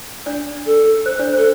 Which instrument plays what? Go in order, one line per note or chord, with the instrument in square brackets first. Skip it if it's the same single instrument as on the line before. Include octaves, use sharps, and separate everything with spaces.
[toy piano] D4 D5
[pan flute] A4
[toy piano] C5
D4 D5
C5
[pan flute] A4